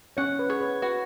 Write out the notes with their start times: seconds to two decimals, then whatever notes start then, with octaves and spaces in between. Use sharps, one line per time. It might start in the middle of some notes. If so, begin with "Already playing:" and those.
0.17 C#4 C#5 F#5
0.39 B4
0.50 G#4 C#5
0.61 B4
0.82 F#4 B4